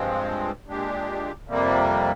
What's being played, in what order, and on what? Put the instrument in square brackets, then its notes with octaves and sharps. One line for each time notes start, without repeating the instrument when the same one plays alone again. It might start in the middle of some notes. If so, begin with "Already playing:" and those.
Already playing: [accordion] G2 F3 G#3 C4
A#2 G#3 D4 G4
F2 C3 G3 A#3